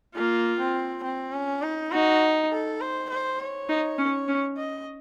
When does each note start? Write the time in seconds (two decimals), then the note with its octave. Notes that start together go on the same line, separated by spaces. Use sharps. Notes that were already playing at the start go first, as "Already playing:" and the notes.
0.15 A#3 F4
0.60 C4
1.04 C4
1.33 C#4
1.63 D#4
1.92 D#4 F#4
2.52 A4
2.81 C5
3.10 C5
3.40 C#5
3.69 D#4
3.98 C#4
4.28 C#4
4.58 D#5